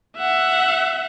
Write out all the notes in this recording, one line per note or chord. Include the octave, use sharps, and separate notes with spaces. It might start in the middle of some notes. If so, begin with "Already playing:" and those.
E5 F#5